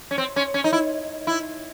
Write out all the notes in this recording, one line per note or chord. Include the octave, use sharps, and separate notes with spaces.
C#4
C4
C#4
C#4
D#4
E4
E4